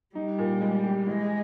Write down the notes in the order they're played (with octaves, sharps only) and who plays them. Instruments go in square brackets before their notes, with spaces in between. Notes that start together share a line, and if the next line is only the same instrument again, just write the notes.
[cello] G3 [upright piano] D#4
[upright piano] A#2
G#3
G4
[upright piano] E3 [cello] G#3